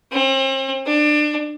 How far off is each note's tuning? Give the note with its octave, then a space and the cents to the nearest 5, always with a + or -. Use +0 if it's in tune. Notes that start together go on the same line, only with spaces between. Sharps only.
C4 +40
D4 +25